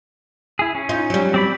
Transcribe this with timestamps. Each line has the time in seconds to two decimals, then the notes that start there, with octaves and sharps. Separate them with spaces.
0.59 E4 G#4
0.75 C#4
0.89 D#4 F4
1.10 F#3 G3
1.34 C4 D5 B5